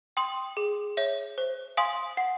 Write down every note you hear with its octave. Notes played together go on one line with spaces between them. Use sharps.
G5 C6 D#6
G#4
C#5 E5
C5
F5 G#5 C6 D#6
F#5